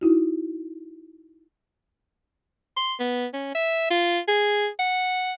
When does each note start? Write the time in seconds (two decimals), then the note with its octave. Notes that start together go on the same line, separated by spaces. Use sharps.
0.01 D#4 E4 F#4
2.77 C6
3.00 B3
3.34 C#4
3.55 E5
3.90 F4
4.28 G#4
4.80 F#5